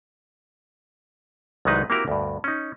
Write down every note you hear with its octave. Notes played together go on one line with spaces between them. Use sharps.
C2 D#3 F#3 G#3 D#4 B4
A#3 C4 E4 F#4 G4 A#4
D2 G2
C#4 D#4